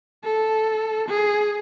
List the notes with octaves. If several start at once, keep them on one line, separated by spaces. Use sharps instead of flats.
A4
G#4